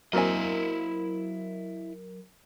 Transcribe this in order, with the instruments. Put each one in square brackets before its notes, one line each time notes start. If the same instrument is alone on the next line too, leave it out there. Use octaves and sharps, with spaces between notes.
[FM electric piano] F#3 A#4 [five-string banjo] A#3 C4 G#5 [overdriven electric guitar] E4 D#5